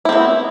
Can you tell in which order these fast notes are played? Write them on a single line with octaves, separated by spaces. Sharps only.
E4 C4 B3